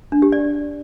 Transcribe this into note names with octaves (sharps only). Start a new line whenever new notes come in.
D4
G4
D5